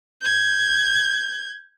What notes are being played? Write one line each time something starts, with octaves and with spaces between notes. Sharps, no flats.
G6 G#6